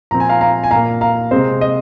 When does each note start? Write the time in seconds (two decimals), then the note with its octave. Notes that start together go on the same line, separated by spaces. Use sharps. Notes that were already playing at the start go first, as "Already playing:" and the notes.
0.11 A#2 F3 C4 A#5
0.20 G#5
0.29 F5 A#5
0.41 F5 A#5
0.64 G#5
0.71 A#2 A#3 F5 A#5
1.01 F5 A#5
1.31 C3 G#3 C4 C5
1.61 D#5